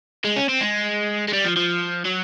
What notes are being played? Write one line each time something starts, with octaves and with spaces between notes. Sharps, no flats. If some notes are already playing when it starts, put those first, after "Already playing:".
G#3
C#4
C4
G#3
G#3
G3
F3
F3
F#3